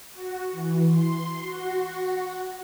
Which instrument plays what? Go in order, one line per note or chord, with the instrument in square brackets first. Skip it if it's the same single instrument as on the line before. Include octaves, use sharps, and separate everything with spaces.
[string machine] F#4
E3
C6
F#4